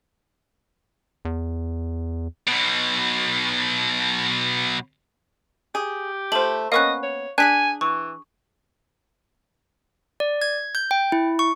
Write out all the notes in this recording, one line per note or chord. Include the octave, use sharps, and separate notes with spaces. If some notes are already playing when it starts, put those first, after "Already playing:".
E2
B1 B2
G4 G#4
A3 F4 C5 F#7
A#3 B3 C#4 D#5 F5 C#6 F#6
C#5
D4 G#4 G#5 F#6 B6 D#7
E3 C#6
D5
G#6
G6
G5
E4
C#6